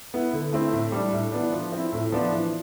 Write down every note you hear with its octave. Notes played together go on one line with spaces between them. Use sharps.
B3 E4
D3
A3 C4 E4
A2
G3 D4
A2
E3 B3 D4
F3
C4 E4
A2
F3 B3 D4
E3